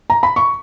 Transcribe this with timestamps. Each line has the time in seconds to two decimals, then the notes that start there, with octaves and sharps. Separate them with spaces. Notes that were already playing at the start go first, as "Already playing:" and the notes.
0.10 A#5
0.23 B5
0.36 C#6